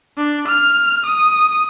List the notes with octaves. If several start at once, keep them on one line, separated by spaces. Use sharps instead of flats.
D4
F6
D#6